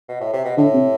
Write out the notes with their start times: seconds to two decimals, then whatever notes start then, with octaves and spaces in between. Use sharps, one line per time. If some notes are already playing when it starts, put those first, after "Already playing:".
0.09 B2
0.21 A2
0.33 C3
0.45 B2
0.57 A2 D3
0.74 C3